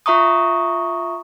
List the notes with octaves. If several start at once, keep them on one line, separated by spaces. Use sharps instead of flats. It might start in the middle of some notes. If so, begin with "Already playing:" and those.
F4 E5 A#5 C#6 D#6